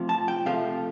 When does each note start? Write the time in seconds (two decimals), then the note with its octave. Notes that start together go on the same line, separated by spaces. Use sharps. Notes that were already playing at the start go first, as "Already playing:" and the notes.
Already playing: C3 F3 A3
0.09 A5
0.28 G5
0.46 C3 F3 A3 F5